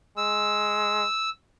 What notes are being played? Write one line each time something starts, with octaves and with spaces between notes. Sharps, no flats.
G#3 E6